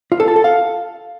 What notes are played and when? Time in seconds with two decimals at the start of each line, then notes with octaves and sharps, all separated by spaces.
0.12 F4
0.20 A4
0.28 A5
0.36 A4
0.44 F5